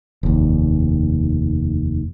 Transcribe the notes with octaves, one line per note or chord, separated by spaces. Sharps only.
F1 D#2